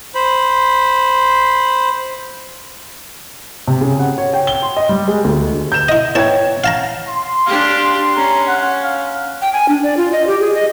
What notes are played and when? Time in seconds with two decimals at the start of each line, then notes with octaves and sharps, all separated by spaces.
0.15 C5 B5
3.68 C3
3.81 C#3
3.99 F#5
4.18 C#5
4.33 G5
4.47 G7
4.62 C6
4.77 D#5
4.89 G3
5.08 G#3
5.25 D2
5.72 G6 E7
5.89 E4 D#5
6.15 E4 C#5 G5 A5 G#6
6.64 F5 A5 A#5
7.09 C6
7.46 D4 G4 F5
8.17 C#4 A#5
8.47 F#5
8.84 F5
9.42 G5
9.53 G#5
9.68 D4
9.83 D5
9.97 F4
10.12 D#5
10.27 G4
10.40 G#4
10.54 D#5